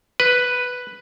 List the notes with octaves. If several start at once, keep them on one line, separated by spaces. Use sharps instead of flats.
B4